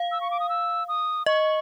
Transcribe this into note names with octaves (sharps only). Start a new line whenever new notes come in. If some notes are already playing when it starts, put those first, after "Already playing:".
Already playing: F5
E6
C#6
D6
D#6
E6
D#6
D#5 C#6